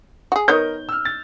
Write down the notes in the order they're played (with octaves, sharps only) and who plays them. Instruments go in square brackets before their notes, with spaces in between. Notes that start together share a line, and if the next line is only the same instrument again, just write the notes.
[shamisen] F#4 G#4
[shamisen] D#3 B3 C#5 [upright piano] A#4 D#5 G6
[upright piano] E6 F6
A6